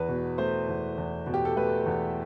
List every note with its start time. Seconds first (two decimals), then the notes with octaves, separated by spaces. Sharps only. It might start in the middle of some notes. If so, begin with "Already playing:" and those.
Already playing: E2 B4
0.08 B2
0.38 A3 C5
0.68 E2
0.98 E2
1.26 B2
1.34 G4
1.45 A4
1.56 A3 B4
1.86 E2